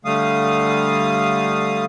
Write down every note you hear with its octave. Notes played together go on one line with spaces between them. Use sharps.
D3 G3 A3 F5 D#6